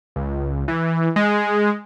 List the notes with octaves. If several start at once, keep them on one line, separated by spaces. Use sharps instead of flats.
C#2
E3
G#3